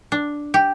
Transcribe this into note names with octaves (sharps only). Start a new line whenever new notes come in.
D4
G4